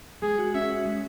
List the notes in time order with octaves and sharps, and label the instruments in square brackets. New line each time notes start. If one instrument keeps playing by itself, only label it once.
[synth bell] G#3 [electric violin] G#4
[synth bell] F#4
[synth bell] C#4 [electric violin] E5
[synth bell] F#4
G#3